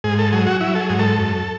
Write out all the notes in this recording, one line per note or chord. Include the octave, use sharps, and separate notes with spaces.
G#2 G#4
A4
F#3 G#4
F#4
F#3 E4
A4
G#4
G#2
A4
F#2